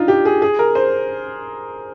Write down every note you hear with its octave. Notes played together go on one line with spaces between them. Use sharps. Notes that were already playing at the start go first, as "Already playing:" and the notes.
Already playing: D4 D#4 F4
G4
G#4
G#4
A#4
C5